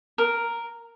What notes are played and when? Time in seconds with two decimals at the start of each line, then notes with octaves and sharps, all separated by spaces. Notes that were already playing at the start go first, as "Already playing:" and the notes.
0.18 A#4